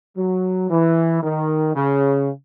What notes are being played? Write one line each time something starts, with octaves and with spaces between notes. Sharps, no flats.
F#3
E3
D#3
C#3